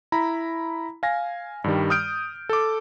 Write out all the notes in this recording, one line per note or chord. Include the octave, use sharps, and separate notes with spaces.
E4 A#5 B5
F5 G#5 A#6
G2 D#3 G3
D#6 F6 G6 D7
A4 D6